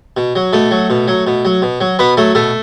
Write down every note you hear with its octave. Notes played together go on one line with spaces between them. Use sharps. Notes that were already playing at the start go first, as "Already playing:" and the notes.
B2
F#3
B2 A3 A4
F#3
B2
F#3
B2
F#3
B2
F#3
B2 B3 B4
F#3 A3 A4
B2 A3 A4